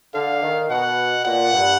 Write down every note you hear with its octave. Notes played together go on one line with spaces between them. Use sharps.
D3 F5
D#3
B2 F#5
A#2 F#5
G2